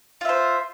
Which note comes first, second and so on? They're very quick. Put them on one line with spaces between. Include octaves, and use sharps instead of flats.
F4 E5 C5